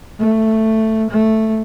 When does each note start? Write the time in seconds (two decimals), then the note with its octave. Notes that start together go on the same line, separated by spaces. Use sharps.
0.20 A3
1.10 A3